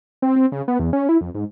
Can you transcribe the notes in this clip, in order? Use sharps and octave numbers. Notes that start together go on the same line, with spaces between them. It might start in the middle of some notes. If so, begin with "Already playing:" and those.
C4
C4
C#3
B3
E2
C#4
E4
F2
G#2